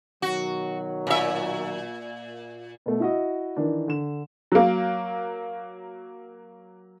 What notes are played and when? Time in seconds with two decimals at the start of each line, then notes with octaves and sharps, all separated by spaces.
0.22 B2 D#3 F#3 F#4
1.07 A#2 E5
2.86 B2 A3
3.00 E4 F#4 D#5
3.56 D#3 E3 D4
3.88 D3 E7
4.52 F#3 A#3